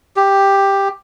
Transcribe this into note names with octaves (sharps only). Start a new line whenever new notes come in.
G4